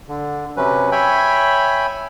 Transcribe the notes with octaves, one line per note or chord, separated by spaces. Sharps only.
D3
C3 F#3 C#4 B4
C#5 E5 G5 G#5 B5